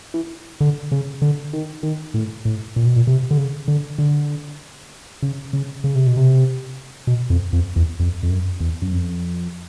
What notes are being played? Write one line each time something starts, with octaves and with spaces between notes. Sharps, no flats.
E3
D3
C#3
D3
D#3
D#3
A2
A2
A#2
B2
A#2
C3
D3
C#3
D3
D3
C#3
C#3
C#3
C3
B2
C3
B2
F2
F2
E2
F2
F2
F#2
E2
F#2
F2